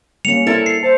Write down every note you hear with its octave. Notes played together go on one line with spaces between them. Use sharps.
G3 A#3 C#4 C#7 F7
E4 A4 A#4 C5 D5
C7
C5 E5 A5